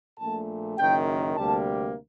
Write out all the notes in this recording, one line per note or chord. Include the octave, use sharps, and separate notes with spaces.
A#1 A#2 A3 A5
F#1 F#2 D#3 G5
D2 C3 G3 A#3 A5